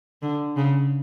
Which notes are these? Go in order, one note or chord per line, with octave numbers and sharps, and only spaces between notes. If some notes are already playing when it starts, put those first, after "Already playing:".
D3
C#3